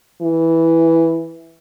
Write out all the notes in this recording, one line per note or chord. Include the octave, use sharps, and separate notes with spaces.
E3